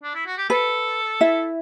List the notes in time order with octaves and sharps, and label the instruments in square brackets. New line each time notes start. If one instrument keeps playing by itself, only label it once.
[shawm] D4
E4
F#4
G4
[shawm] A4 [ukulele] B4
[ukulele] E4 E5